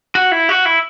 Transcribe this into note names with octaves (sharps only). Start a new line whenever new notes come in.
F#4
E4
F#4
E4